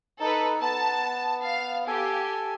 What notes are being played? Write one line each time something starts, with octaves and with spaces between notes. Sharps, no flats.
D#4 A4 B4
B3 A5
F5
G4 A4 G#5